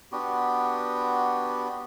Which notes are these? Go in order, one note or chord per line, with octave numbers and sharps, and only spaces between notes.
B3 D4 F#4 G4